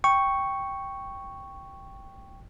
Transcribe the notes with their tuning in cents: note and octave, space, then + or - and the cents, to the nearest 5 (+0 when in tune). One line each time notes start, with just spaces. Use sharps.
G5 +0 C#6 +0